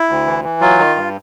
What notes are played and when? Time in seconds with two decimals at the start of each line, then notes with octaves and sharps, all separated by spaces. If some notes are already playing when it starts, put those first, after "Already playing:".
Already playing: E4
0.09 D2
0.27 E3
0.44 E3
0.61 F#3 F4
0.78 D#3
0.96 G2